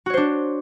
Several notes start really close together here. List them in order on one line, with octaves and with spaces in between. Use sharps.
F#4 C#5 C5 D4